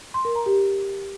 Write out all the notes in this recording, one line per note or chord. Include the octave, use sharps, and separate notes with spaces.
C6
A#4
A#5
G4